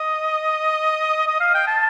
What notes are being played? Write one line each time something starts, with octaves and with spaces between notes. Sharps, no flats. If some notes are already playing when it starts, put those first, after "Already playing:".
Already playing: D#5
D#5
F5
G5
A5